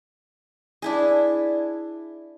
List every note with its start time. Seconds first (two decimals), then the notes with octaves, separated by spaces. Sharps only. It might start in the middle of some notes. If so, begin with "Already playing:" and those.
0.82 D4 E4 G#4